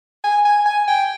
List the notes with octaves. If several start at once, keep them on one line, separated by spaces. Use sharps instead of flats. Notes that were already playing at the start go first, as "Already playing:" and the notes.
G#5
G#5
G#5
G5